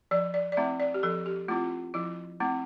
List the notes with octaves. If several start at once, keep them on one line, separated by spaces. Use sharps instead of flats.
F3 D5
D5
D5
A3 C4 E4 E5
D5
G4
F3 A4
G4
A3 C4 E4 F4
F3 E4
A3 C4 E4